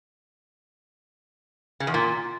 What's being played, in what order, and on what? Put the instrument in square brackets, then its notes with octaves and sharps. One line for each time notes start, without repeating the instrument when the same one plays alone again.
[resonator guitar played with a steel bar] C#3
E2
A#2